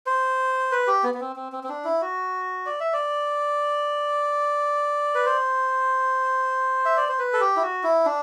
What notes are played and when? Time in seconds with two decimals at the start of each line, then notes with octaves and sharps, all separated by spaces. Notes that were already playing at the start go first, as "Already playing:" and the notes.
0.06 C5
0.72 B4
0.87 G4
1.04 B3
1.14 B3
1.21 C4
1.36 C4
1.52 C4
1.64 C4
1.69 D4
1.85 E4
2.01 F#4
2.66 D5
2.80 E5
2.93 D5
5.15 B4
5.26 C5
6.85 E5
6.97 D5
7.09 C5
7.19 B4
7.33 A4
7.41 G4
7.57 E4
7.62 F#4
7.84 E4
8.06 D4